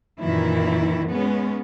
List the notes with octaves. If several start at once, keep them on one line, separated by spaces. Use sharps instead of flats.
F#2 A#2 D#3 E3 E4
G#3 B3 C#4